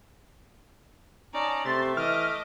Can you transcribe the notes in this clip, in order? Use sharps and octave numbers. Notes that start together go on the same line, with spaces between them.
C#4 D#4 D5 A5 A#5
C3 A3 E5 C6 A6
E3 D#5 D6 F6